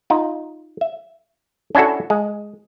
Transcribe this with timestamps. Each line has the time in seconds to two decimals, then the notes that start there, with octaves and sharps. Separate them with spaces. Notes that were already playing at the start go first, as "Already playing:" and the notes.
0.10 D#4 F4
0.81 E5
1.75 C#4 D4 E4 F#4 A4
2.10 G#3